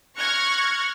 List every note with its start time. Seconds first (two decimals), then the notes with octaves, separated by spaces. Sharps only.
0.16 C#6 F6 F#6 G#6 A#6 C#7